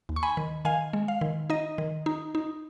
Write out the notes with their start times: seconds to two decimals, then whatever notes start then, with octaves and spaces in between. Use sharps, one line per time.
0.09 D#2
0.16 C#6
0.23 G#5 B5
0.37 D#3
0.65 D#3 F5 G#5
0.93 G#3
1.08 F5
1.21 D#3
1.50 D#4 D#5
1.78 D#3
2.06 D#4
2.35 D#4